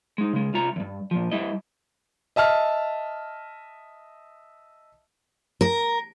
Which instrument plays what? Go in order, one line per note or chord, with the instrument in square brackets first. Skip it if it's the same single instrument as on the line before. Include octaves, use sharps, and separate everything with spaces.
[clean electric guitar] G#3 D#4
C#3 G#3
C2 F4 A#5
E2 G2
A#2 F3
G3 E4 D#5
[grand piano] D#5 E5 A5 F6
[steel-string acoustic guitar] A#4